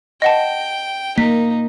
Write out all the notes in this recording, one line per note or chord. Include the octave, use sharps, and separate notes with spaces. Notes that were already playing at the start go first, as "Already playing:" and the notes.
D#5 F#5 G5 A5
A#3 D#4 B6